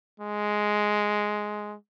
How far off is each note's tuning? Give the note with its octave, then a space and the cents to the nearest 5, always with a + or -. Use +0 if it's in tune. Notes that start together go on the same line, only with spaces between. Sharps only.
G#3 +5